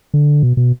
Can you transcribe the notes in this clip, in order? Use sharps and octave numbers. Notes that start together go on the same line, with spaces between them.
D3
B2
B2